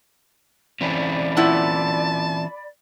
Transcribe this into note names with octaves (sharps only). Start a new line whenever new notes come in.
E3 C4 C#4 D5 B5
A#2 E4 F#5 A5